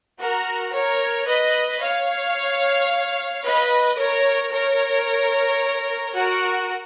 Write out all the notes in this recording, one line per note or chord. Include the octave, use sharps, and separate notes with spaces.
F#4 A#4
A#4 C#5
B4 D#5
C#5 F5
B4 D#5
A#4 C#5
A#4 C#5
F#4 A#4